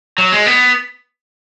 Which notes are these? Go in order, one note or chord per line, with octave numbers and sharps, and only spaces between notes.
F#3
G#3
B3